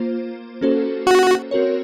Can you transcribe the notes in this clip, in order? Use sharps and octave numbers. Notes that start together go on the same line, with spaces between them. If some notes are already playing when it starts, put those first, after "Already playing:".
Already playing: A#3 F4 C5
A#3 C#4 F#4 A4 C5
F#4
C4 F#4 A#4 C#5